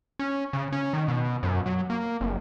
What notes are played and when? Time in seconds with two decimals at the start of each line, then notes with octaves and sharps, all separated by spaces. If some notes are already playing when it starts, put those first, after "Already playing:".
0.19 C#4
0.53 C#3
0.72 C#4
0.93 D#3
1.08 B2
1.43 F#2
1.66 F#3
1.90 A#3
2.21 F#1